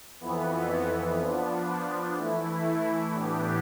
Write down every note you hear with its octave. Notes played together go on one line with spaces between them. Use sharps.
F2 E3 B3
F3 B3 D4
E3 A3 E4
A2 E3 B3 D4 G4